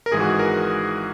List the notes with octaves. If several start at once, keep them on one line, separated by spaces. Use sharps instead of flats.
A#4
G#1 G#2 E3 G#3 G#4
F#4
G#4
A#4